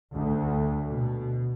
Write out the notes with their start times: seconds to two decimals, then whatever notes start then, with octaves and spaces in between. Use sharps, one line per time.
0.14 D2
0.88 B2